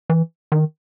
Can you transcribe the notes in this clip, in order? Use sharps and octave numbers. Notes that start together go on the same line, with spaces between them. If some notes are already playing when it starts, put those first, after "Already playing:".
E3
D#3